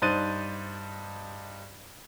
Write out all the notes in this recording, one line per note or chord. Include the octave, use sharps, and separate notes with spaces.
G2 D#4 C5 F#6 A6 D#7